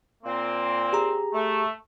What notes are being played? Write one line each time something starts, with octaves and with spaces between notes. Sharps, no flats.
A#2 A#3 C4
G4 G#4 A#5
A3